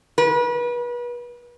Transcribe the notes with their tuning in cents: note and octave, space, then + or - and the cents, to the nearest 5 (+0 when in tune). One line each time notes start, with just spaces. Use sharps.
B4 -35